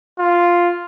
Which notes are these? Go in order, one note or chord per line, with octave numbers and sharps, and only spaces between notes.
F4